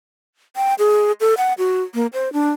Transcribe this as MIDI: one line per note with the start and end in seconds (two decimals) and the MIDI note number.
0.56 0.74 79
0.79 1.12 68
1.21 1.34 69
1.38 1.53 78
1.58 1.82 66
1.94 2.07 58
2.13 2.32 72
2.33 2.50 62